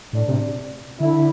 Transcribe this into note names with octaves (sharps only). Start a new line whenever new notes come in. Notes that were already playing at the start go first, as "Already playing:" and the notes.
A2 D4
C3
D3 E4